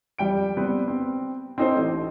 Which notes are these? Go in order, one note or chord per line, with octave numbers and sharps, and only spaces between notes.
F2 G3 G5 D7
G3 B3 C4
C4
C4 C#4 D#4 A4 C5
A1